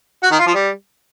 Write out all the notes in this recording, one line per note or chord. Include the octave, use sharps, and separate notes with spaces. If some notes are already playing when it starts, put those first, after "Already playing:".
F#4
D#3
F4
F3
G3